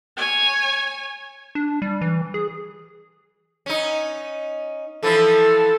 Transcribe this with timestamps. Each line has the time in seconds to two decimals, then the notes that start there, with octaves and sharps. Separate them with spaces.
0.17 C#5 G#5
1.55 D4
1.82 G3
2.01 E3
2.34 G#4
3.66 C#4 D#4
5.03 E3 F3 E4 A4